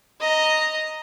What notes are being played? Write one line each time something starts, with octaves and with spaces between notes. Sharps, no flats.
D#5 A#5